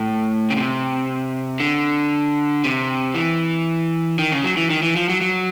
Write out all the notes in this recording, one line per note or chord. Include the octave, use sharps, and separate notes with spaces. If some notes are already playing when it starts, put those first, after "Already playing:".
Already playing: A2
C#3
C3
D3
C3
E3
D#3
C#3
F#3
E3
D#3
E3
F3
F#3
F#3